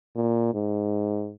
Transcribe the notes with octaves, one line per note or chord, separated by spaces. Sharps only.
A#2
G#2